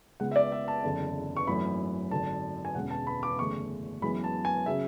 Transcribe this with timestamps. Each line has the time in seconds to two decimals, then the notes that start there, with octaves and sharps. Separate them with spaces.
0.20 C#2 C#3 G#3 B3 F#5
0.31 E5
0.36 D5
0.52 E5
0.68 A5
0.83 F#1 E2 D3
1.36 C#6
1.47 G#1 F#2 E3 A3 B5
2.11 G#1 F#2 D3 F#3 A5
2.65 G#5
2.75 E1 E2 D3 G#3 C#4 F#5
2.91 A5
3.07 B5
3.23 D6
3.39 F#1 E2 D3 A3 C#4 C#6
4.02 F#2 E3 G#3 B3 B5
4.24 A5
4.45 G#5
4.66 C#3 F#3 C#4 E5